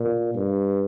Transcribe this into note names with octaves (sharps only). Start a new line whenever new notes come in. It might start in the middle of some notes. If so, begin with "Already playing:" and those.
Already playing: A#2
G2